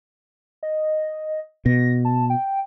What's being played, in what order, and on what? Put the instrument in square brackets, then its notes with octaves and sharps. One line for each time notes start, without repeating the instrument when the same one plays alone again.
[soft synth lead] D#5
[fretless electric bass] B2 [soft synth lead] A#6
[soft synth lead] A5
G5